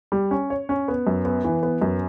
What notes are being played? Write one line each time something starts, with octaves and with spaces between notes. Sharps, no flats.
G3
C#4
C#5
C#4
B3
F#2
B3
E3
B3
F#2